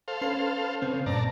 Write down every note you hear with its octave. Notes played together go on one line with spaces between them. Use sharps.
A4 C5 F5
C#4 B4 C7
C#3 C4
G2 A#2 D5 A5 A#5 A#6